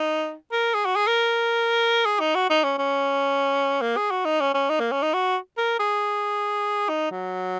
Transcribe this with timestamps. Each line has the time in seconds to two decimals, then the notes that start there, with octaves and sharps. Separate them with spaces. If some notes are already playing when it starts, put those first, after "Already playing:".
Already playing: D#4
0.52 A#4
0.74 G#4
0.85 F#4
0.96 G#4
1.07 A#4
2.05 G#4
2.20 D#4
2.35 F#4
2.50 D#4
2.64 C#4
2.79 C#4
3.82 A#3
3.97 G#4
4.11 F#4
4.25 D#4
4.41 C#4
4.54 C#4
4.70 D#4
4.80 A#3
4.92 C#4
5.02 D#4
5.14 F#4
5.58 A#4
5.80 G#4
6.89 D#4
7.11 F#3